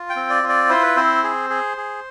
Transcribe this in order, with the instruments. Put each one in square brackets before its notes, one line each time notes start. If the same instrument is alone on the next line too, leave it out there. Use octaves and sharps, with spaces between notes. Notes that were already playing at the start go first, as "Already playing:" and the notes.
Already playing: [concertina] F4
G5
C4
D5
F4
D5
E4 C5
B4
C4 C5
G#4
G#4
G#4